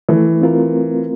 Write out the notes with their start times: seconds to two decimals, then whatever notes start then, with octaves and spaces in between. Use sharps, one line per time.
0.09 E3 A3
0.42 C4 F4 A#4